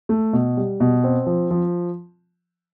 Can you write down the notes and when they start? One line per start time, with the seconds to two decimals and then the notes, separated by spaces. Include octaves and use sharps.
0.09 A3
0.33 B2
0.57 G3
0.80 B2
1.04 C4
1.26 F3
1.51 F3